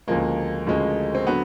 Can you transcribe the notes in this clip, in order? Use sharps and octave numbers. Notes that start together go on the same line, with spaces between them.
D2 C#3 F3 G#3 A#3
D2 C#3 F3 G#3
C4
D3 F#3 B3